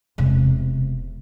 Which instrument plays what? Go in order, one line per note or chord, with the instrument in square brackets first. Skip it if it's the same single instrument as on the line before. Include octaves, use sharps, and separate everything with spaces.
[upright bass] E1 C3